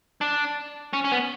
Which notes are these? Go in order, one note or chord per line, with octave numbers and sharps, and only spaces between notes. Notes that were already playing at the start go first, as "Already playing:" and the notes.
D4
C#4
C#4
B3